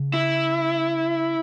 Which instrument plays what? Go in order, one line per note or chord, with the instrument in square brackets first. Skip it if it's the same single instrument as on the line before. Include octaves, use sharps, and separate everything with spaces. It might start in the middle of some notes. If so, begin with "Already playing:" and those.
Already playing: [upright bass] C#3
[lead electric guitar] E4